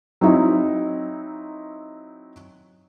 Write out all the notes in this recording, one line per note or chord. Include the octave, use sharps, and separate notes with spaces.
F#3 C4 D#4 E4